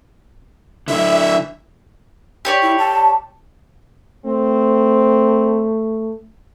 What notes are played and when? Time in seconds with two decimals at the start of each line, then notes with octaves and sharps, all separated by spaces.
0.88 D3 E4 E5
2.45 G4 C#5 D5
2.62 E4
2.78 A5
4.25 A3 C4